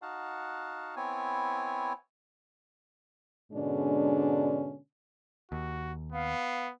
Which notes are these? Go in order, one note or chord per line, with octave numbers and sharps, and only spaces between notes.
D#4 F#4 F5 F#5 A5
B3 C4 E4 C#5 G#5
G#2 B2 D3 G#3 C#4 D4
D#2 F#4
B3 F5